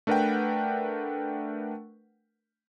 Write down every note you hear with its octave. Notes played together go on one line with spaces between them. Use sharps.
A3 D4 A#4 B4 F#5 G5